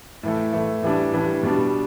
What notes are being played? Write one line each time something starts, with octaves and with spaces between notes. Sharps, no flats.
A2 E3 A3
A2 E3 A3
A2 E3 G3 D4
A2 E3 G3 D4
B2 G3 D4